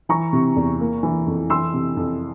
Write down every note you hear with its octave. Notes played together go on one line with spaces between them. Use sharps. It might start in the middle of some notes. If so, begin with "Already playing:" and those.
E3 A#5 C#6
C3
E2
A#3
E3
F2
E3 C6 E6
C3
F2